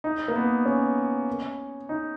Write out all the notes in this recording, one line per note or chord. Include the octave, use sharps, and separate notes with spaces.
D#4
A#3
B3
C#4
D#4